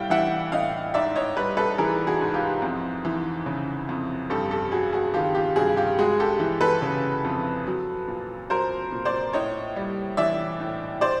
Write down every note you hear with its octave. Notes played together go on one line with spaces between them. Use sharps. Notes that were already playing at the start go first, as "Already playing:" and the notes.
Already playing: A2 G3 F5 G5
E3 E5 F#5
A2 D#5 F5
G#2 D5 E5
C#5 D#5
G3 B4 C#5
A4 B4
E3 G#4 A#4
F#4 G#4
G#2
F4 G4
F2
E3
C#3
F2
G2 G4 A4
G4 A4
F#3 F#4 G#4
F#4 G#4
D#3 F4 G4
F4 G4
G2 F#4 G#4
F4 G4
G#3 F#4 G#4
G4 A4
E3
A4 B4
C#3
F2
F#3
A#2
F#3 A#4 C5
A#2
C5 D5
A2 C#5 D#5
G3
E3 D5 E5
A2
C5 D5